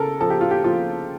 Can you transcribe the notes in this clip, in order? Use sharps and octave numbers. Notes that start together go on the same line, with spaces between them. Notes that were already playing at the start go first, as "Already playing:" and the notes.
Already playing: C#3 A4 A#4
F3 A4
G4
F4
G4
F3 F4